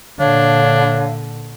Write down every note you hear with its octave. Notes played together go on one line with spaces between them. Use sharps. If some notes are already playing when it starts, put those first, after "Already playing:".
A#2 D3 D4 C#5 F5